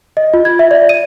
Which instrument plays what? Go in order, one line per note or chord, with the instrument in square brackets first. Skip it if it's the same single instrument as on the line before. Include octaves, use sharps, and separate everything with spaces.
[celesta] D#5
F4
G#6
E5
D5
D#7